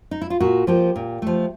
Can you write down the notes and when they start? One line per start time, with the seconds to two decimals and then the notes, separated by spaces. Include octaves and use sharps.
0.11 D#4
0.21 E4
0.30 F4
0.40 A#2 F#4
0.67 F3 A#3 G4
0.96 A#2
1.22 F3 A3